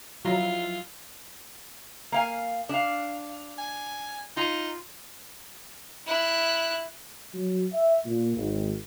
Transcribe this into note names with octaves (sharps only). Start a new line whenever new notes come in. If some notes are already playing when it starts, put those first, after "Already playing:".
F3 F#3 E4 F4 A#5
A#3 F5 G#5
D4 F5
G#5
D#4 F4
E4 F#6
F#3
E5
A#2
G#1